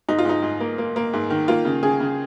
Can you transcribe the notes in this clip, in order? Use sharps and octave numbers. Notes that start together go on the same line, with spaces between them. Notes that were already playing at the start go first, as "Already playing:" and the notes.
G#2 D#4
F4
G#2 D#4
G#2
A#3
A#3
A#3
G#2
D#3
A#3 F4
C#3
C#3 G#4
C#3